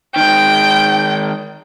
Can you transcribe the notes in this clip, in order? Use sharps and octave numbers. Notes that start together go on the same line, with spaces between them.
D#3 G#3 G5